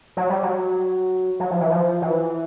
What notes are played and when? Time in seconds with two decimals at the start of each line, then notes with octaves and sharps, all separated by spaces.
0.17 F#3
0.29 G3
0.43 F#3
1.40 F#3
1.51 F3
1.61 E3
1.71 F3
2.02 E3